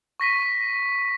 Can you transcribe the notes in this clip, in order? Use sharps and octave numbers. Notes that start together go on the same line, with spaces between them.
C#6 A#6 B6 D#7